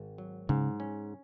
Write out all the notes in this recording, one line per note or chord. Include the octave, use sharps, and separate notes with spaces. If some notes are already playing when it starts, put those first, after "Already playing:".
Already playing: G#1
F#3
G#2 C#3
C#4